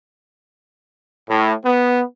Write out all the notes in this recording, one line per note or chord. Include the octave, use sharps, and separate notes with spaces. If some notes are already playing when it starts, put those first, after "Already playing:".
A2
B3